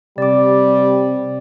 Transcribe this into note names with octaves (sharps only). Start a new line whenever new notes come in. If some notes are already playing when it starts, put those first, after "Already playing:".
C3 G3 D5 D6